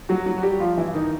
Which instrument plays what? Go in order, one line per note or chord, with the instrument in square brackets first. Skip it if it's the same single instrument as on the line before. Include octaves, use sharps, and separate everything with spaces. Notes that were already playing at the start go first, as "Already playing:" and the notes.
[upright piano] F#3 F#4
F#3 F#4
F#4
G3 G4
F3 F4
E3 E4
D#3 D#4